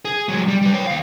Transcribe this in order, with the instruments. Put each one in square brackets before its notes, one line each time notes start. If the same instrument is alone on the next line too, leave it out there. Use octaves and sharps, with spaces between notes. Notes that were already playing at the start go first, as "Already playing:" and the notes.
[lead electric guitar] G#4
F#3 G#3
G3
G3 B4
C#5 G5
D#2 F5